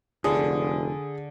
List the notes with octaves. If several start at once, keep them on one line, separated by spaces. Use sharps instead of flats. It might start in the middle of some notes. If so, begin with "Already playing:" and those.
F1 D3 G#4